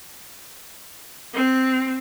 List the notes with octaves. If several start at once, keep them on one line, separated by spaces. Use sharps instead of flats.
C4